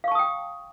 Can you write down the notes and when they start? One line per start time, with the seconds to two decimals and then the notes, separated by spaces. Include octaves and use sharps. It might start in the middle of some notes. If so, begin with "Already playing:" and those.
0.04 F5
0.08 C#6
0.11 A5
0.15 D#6
0.19 G5